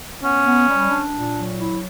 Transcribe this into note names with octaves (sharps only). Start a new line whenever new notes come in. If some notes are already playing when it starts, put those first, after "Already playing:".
B3 C#4
B3
G3
D4
A#2
F#3
E4